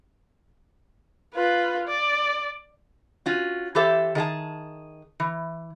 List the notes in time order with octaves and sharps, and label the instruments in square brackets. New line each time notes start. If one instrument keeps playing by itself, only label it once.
[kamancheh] F4 B4
D5
[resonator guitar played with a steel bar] C#4 F4 F#4
E3 G4 A4 C5 E5
D#3 G#4 F5 A5
E3